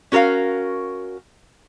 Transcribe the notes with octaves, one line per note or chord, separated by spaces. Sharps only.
C#4 F#4 A#4 B4 F5